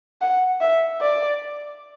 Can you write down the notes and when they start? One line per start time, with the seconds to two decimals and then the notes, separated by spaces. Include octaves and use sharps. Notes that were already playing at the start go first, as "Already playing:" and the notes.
0.21 F#5
0.61 E5
1.01 D5